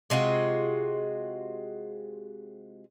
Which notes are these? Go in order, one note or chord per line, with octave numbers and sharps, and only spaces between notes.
C3 G#3 F4 F#4